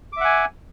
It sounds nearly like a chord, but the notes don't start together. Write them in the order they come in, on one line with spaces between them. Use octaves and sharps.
D6 E5 F#5 G#5